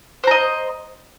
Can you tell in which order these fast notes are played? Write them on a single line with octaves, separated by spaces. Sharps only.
C5 A#5 D#5